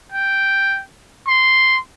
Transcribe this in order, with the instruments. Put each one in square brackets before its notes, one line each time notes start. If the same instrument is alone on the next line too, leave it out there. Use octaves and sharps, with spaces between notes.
[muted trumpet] G5
C6